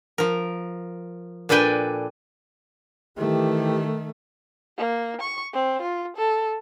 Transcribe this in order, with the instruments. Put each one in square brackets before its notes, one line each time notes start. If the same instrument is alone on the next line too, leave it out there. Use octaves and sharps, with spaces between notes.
[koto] F3 A#4
A#2 D4 A4 B4 G5 G#5
[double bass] D#3 A3 [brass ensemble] E3 G4
[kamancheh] A#3
C#6
C4
F4
A4